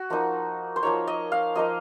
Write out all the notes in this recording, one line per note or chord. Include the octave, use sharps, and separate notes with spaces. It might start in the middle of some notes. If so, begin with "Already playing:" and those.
Already playing: F#4
F3 A#3 D#4
C5
F3 A#3 D#4 C#5
D#5
F5
F3 A#3 D#4 D#5